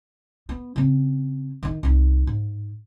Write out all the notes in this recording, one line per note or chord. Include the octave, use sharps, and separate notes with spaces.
B3
C#3 C4
D#3 D#4
C2 D#4
G#2